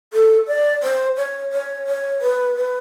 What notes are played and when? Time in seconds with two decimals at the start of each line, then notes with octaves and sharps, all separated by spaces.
0.13 A4
0.48 D5
0.83 C5
1.17 C#5
1.52 C#5
1.87 C#5
2.21 B4
2.56 B4